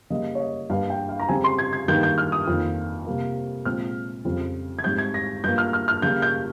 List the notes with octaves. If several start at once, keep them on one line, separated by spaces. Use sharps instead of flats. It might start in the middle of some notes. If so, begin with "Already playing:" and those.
C#3 G3 A#3 D#5
C#5
D#5
G2 G3 A#3 F5
G5
F5
A#5
C#3 G3 C4 G#5
C6
G#6
G#6
G2 D#3 G3 A#3 G6
G6
F6
D#6
F2 D#3 A#3
C3 G3 A#3
A#2 F3 G#3 C4 F6
F2 C#3 G3 C4
G#6
G#2 G3 C4 G6
G#6
A#6
G2 F3 A#3 G6
F6
F6
F6
C#3 G3 A#3 G6
G6